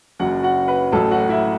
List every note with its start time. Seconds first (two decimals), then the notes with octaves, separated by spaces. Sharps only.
0.19 F#1 F#2 F#3 F#4 F#5
0.43 F#4 F#5
0.68 B4
0.92 A1 A2 F#3 A4 A5
1.11 F#4 F#5
1.29 E4 E5